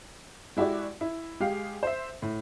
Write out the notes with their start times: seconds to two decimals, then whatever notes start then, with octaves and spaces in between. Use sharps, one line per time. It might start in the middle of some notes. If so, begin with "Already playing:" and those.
0.57 G#3 E4 F#4 G4 D5
1.01 E4
1.40 G#3 G4 G#4 F5
1.83 C5 E5
2.22 A2